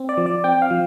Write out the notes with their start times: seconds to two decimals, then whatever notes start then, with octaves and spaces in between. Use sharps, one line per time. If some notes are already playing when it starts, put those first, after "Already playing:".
Already playing: C4
0.09 D5
0.17 F3
0.26 D5
0.44 C4 G5
0.62 F5
0.71 F3